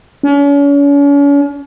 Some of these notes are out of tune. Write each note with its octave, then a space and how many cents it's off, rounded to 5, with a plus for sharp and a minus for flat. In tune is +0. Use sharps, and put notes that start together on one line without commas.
C#4 +40